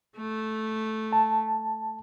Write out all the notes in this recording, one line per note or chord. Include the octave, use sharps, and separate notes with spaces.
A3
A5